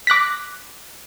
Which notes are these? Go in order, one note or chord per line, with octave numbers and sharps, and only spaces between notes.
D6 F#6 A#6 B6